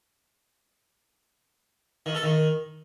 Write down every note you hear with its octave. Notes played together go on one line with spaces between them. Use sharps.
D#3
A4
D#3